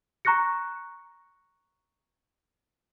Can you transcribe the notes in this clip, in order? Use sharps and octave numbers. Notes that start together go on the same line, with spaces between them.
A#5 C#6 F#6 A#6 C#7